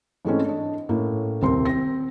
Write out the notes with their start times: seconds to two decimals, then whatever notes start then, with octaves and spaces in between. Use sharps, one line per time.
0.25 G#2 E3 G#3 A3 C4 C#4
0.45 D4 D#5
0.89 A2 A#3 C#4 A4
1.42 D#1 C2 C4 A#4 C6
1.65 C4 A#6